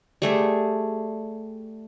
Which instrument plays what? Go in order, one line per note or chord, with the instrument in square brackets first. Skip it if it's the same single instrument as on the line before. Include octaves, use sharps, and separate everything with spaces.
[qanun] G3 A3 G#4